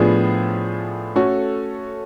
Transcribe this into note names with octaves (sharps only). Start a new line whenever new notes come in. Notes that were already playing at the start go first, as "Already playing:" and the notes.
Already playing: A2 F3 B3 D4 G#4
A3 C#4 F#4 A4